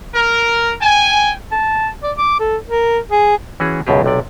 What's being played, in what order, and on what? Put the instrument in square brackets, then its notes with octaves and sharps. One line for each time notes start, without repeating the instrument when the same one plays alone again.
[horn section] A#4
G5 G#5
[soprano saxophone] A5
D5
D6
A4
A#4
G#4
[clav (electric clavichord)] E3 C#4 F#4 G#4
C#2 F#2 B2 G4 G#4
B1 C3 D5